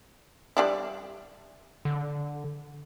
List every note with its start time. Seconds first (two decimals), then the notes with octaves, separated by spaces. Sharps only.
0.57 G3 D4 E4
1.85 D3